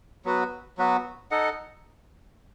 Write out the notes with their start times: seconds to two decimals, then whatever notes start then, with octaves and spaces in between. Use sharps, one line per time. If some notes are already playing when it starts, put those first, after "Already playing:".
0.25 F#3 B3 F#4 B4
0.78 F#3 B3 F#4 B4
1.31 D#4 A4 D#5 F#5